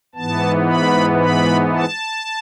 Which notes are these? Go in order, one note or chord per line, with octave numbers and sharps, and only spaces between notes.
G#2 E3 B3 A5
B5
B5
A5